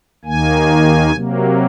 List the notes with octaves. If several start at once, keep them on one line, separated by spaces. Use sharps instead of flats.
D#2 D#3 A#3 G#5
C3 F#3 A#3